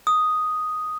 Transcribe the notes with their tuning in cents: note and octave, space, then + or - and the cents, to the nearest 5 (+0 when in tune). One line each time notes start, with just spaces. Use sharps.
D#6 +0